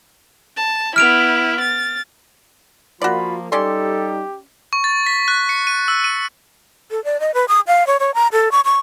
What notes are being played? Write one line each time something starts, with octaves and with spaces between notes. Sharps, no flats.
A5
B3 E4 F6 D7 F7
A6
F3 A#3 F4 F#4 D5 B5
G3 C#4 D#4 G4 A4 D5 C6
C#6
A6
B6
F#6
C#7
D#7
E6
D#7
A4
D5
D#5
B4
D#6
F5
C#5
C#5
A#5
A4
C#6
C#6